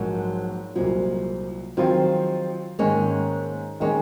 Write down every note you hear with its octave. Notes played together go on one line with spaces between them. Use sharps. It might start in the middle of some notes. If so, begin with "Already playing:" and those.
Already playing: A#1 G#2 F3 F#3 G#3 A#3
C2 A#2 F3 F#3 G#3
D#3 F3 F#3 G#3 C4 F4
G#2 D#3 G#3 A#3 C#4
D#3 G#3 A#3 C#4 D#4 G#4